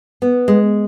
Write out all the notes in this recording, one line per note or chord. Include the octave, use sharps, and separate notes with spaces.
B3
G#3